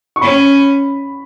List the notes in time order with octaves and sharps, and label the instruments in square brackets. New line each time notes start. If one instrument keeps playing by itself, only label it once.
[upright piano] C#6
[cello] C#4 [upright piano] B5